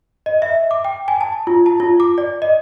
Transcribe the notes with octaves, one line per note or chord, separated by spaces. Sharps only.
D#5
E5
D6
G5
G#5
A5
F4
A5
F4
D6
D5
D#5